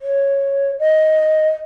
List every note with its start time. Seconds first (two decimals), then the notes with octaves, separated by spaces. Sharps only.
0.02 C#5
0.79 D#5